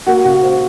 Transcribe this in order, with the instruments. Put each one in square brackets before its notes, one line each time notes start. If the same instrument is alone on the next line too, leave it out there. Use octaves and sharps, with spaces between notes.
[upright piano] A#3 F#4
C#3 F#4
A#3 C5